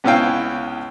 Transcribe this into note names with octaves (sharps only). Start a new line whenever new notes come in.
C#2 B3 C#4 E4 F5 G5